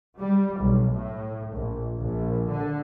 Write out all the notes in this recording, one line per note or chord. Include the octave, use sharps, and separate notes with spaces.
G3
B1
A2
A#1
A#1
D3